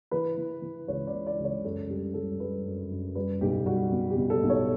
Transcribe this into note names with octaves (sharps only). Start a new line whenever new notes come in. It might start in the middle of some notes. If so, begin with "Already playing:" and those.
E3 B4
E3
E3
C#2 C#5
D5
E3
D5
C#2
C#5
F#2 A4
G3 G4
G3 A4
G3 B4
F#2
F#2
G3 B4
B1 G4
G3 F#4
B2
G4
B2
A4
B1
C#5